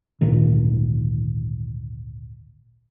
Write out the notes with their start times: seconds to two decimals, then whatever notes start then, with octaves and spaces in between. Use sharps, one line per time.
0.21 G#1 D2 A#2 D#3